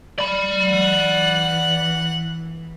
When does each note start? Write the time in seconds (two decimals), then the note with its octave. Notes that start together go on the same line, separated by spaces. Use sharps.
0.19 D5 B5
0.68 E3 F#5 F#6